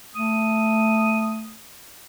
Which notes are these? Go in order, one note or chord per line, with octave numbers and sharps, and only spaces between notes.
A3 D#6